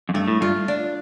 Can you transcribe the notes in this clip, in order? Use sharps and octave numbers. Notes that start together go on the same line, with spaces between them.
F2
G2 A3
A2
G2 F4
D4